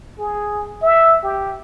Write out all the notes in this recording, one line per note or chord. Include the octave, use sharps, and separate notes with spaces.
G#4
E5
G4